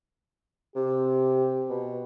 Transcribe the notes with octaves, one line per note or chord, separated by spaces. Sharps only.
C3 G4
B2